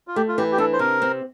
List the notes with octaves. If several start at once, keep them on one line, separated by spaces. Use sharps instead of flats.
F4
A3 G4
F4
E3 G4
G4
D4 A4
C5
C3 A#4
C4